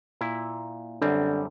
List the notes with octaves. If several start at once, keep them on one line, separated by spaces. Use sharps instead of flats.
A#2 E4
F#2 D3 G3 C4